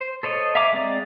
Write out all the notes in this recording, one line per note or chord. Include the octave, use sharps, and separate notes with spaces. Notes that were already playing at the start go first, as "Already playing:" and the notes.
C5
A4 C5 C#5 D#5
E5 F5 G#5 A#5 D6
G#3 C4 D5